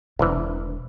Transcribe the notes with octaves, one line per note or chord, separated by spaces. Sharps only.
E1 C2 D3 E3